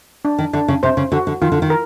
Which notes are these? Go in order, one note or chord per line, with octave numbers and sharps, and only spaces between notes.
D4
D#3
D3 D4
C#3
C3 C5
C#3
D3 F#4
D3
D#3 F4
D3
D#3
A#4